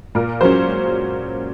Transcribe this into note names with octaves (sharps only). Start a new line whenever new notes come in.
A#2 A#4
F#3 C#4 C5